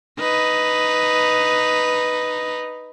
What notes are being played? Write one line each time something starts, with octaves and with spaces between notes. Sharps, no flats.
D#4 B4